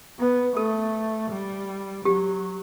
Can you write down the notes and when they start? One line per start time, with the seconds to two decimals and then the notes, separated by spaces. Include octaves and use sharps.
0.19 B3
0.56 A3 A4
1.31 G3
2.05 F#3 G4